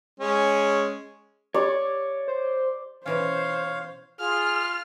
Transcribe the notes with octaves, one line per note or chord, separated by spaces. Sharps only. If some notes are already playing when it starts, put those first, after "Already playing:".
G#3 C#4
G4 C#5 D5
C5
B2 E3 C#4 C5 C#5 F5
F4 G#4 F6